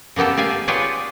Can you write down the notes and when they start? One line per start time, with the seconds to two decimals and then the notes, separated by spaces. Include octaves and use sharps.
0.16 C#3 A#3 B3 G4 A4
0.37 G4 D5 F5 G#5
0.68 F4 G4 G#4 B4 C#5 D5